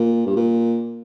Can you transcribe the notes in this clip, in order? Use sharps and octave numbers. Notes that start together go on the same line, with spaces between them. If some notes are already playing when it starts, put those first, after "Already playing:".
Already playing: A#2
G2
A#2